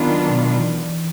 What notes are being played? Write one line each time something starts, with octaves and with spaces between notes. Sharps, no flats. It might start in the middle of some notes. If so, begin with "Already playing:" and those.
Already playing: D#3 F#3 B3 D4 F4
B2
B2
E3